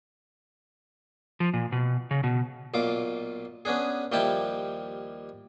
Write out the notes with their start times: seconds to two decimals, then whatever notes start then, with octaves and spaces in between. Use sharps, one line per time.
1.40 F3
1.54 A#2
1.72 B2
2.11 C#3
2.23 B2
2.74 B1 A#2 F4 D6
3.65 B3 C#4 D4 G#4
4.12 D#2 F3 G3 E4 G5 A5